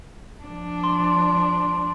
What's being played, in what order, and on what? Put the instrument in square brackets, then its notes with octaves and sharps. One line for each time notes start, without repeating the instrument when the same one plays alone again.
[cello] F3 D4
[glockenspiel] C6